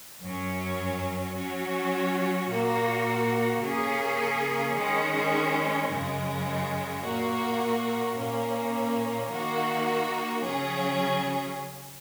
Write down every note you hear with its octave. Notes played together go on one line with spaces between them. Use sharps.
F#2 F#3 C#4
F#3 C#4 F#4
A#2 A#3 F#4
C#3 A#3 C#4 G#4
D#3 G#3 C#4 G#4
F#2 C#3 G#3
A#2 A#3 F#4
A#2 A#3 C#4
D#3 A#3 F#4
C#3 F#3 C#4 G#4